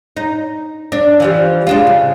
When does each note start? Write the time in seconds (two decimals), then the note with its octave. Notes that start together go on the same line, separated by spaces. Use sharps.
0.17 D#4
0.92 D4
1.20 E3 F3 G3
1.67 G#3 D4 F4
1.87 C#3